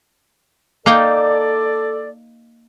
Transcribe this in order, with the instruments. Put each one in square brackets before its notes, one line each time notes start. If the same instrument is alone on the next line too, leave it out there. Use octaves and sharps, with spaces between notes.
[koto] A#3 D#4 G5 [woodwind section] A4 D5